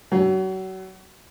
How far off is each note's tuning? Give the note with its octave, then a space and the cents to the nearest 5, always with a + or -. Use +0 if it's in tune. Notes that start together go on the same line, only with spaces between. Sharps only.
F#3 +30